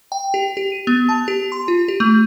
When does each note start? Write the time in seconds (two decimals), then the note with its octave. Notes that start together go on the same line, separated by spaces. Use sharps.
0.12 G5
0.34 G4
0.57 G4
0.72 D#7
0.87 B3
1.09 A5
1.28 G4
1.52 C6
1.68 F4
1.88 G4
2.00 A3